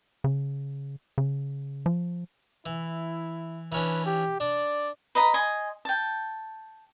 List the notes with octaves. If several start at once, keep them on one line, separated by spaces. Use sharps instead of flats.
C#3
C#3
F3
E3 E4
E3 C#4 D4 B4
G4
D4 D5
B4 D#5 A#5 B5
D#5 G#5 C6
G5 A5